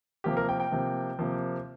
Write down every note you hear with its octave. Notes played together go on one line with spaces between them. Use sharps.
C3 F3 A#3 G4
A#4
G5
G5
C3 F3 A#3
C3 F3 A#3